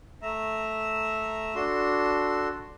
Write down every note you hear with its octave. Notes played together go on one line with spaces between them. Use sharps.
A3 E5 A#5
D4 F#4 A4 C6